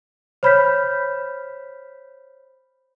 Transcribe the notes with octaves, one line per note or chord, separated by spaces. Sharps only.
C5 C#5 B5 F6 G6 B6